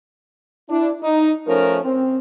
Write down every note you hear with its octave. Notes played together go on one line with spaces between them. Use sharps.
D4 E4
D#4
F3 A3 C#4 A#4
C4